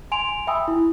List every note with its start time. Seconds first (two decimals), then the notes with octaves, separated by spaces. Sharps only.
0.12 G#5 C6 D7 F7
0.47 E5 G5 G#5 B5 D#6 E6
0.68 E4